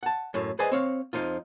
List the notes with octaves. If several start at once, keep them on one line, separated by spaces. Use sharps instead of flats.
F#5 A5
F#2 A2
G#4 B4 C5 D5 D#5 G#5
C4 C#5 F5
F2 F3 D#4 F4